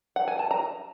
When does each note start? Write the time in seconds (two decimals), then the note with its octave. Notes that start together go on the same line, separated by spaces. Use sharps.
0.16 F#5
0.28 G#5
0.39 A5
0.51 A#5